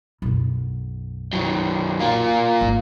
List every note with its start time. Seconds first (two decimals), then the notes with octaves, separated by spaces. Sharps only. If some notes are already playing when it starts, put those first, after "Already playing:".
0.22 B1 F#2
1.33 D#3 F#3
2.00 A#3 F4
2.61 G#1